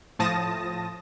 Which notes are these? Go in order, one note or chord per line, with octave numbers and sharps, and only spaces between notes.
A2 F3 A5 D#6 A#6